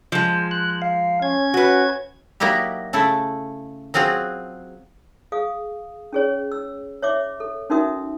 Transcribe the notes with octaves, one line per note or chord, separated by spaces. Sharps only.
F3 G#3
F#6
F5
C#4 G#6
F#4 B4
F#3 A#3 D#4 E4 G4
C#3 A3 E4 A4
F#3 C4 F4 F#4 G#4
G#4 F5 D#6
C#4 G#4 C#5
E6
C#5 E5 D6
A4
C#4 D#4 F#4 A#4 E5 D#6